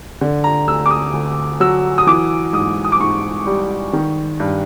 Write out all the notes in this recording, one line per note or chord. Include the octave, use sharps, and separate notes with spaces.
D3
A#5
D2 E6
D6
D#6
D2
F#3 E6
D#6
E3 D6
G#2 D#6
D#6
D6
G#2 C#6
G3
D#3
G2